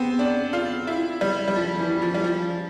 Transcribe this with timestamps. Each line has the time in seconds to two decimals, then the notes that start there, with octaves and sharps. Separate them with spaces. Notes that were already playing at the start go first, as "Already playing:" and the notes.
Already playing: B3 C4
0.19 D4
0.53 F4
0.87 E4
1.21 G3
1.48 G3
1.56 F3
1.79 E3
2.02 F3
2.14 G3
2.24 F3